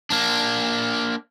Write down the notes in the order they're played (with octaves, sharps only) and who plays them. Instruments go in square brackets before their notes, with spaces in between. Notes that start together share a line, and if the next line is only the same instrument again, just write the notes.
[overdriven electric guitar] A#3 D4